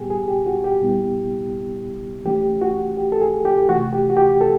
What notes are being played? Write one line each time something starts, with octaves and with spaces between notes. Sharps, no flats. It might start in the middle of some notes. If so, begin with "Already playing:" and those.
Already playing: A#2 G3 B3 G4 G#4
G#4
G4
F#4
G4
A#2 G3 B3 E4
E3 A3 C#4 G4
F#4
G4
A4
G#4
G4
C3 E3 A3 F#4
G4
F#4
G4
A4